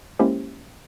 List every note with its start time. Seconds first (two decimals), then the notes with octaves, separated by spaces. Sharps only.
0.19 G#3 A#3 C#4 E4 G4 C5